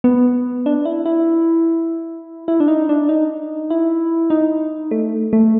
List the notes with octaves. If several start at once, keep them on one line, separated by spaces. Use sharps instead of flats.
B3
D4
E4
E4
E4
D4
D#4
D4
D#4
E4
D#4
A3
A3